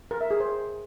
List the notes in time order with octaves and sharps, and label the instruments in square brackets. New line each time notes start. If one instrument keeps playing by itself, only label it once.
[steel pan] A#4
E5
G#4
C5